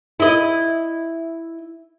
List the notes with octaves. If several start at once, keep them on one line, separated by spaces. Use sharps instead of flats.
E4 D#5